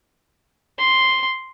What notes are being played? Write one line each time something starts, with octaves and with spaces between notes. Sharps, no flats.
C6